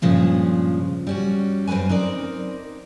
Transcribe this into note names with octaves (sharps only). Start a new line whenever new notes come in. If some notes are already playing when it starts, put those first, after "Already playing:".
G2 A#2 C#3 F3 G#3
G3 C#4 F#4
F#2 C4 A4 B4 G#5
C4 D#4 A#4 D5